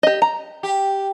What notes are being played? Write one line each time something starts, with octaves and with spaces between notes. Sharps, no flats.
G4 D#5
A#5
G4